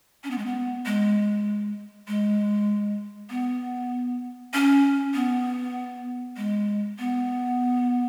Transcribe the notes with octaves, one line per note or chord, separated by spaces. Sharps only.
C#4
B3
G#3
B3
G#3
G#3
B3
C#4
B3
G#3
B3